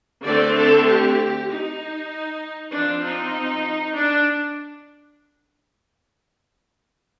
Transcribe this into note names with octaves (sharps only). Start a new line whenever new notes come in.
D3 A3 C4 D5
A4
G4
D#4
F3 C4 D4
D#4
D4